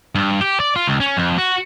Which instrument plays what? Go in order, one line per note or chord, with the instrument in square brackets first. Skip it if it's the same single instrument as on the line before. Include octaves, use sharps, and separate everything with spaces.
[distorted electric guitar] G2
G4
D5
F4
C#2
C#4
F2
F#4